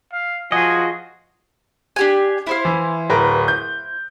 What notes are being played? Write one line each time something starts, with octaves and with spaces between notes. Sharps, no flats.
F5
F3 F#4 G#4 D#5 G#5
D4 G4 G#5
E4 C5 F5
E3
D1 A#4 B4
G6